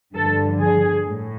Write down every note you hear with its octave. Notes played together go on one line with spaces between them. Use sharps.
G2 D3 F3 A4
G#4
A2